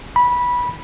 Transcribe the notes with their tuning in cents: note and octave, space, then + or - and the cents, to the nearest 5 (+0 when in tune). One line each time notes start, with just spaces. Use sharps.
B5 -15